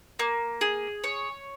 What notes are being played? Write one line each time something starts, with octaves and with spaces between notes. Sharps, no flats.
A#3
G#4
C#5